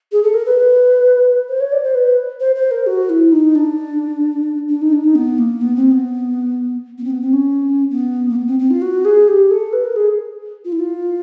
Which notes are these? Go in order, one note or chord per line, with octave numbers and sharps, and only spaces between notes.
G#4
A4
A#4
B4
C5
C#5
D5
C5
B4
C5
C5
A#4
F#4
E4
D#4
D4
D4
D#4
D4
D#4
B3
A#3
B3
C4
B3
B3
C4
B3
C4
C#4
B3
A#3
B3
C4
C4
F4
F#4
G#4
G4
A4
B4
A#4
G#4
F4
E4
F4